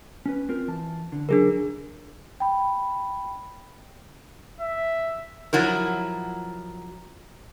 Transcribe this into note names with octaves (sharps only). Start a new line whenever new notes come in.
C#4 B4
C4 F4 A#4
E3 A5
D3
C#3 F#3 D4 G#4 A#4
G5 B5
E5
F3 F#3 E4 A#4